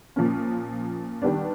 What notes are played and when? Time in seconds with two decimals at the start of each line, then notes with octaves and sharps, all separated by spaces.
0.16 A#2 F3 A#3 C#4
1.22 D#3 G3 B3 D4